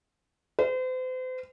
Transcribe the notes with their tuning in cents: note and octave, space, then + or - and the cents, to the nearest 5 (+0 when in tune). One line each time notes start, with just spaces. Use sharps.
C5 -40